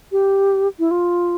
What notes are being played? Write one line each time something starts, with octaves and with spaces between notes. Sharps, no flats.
G4
E4
F4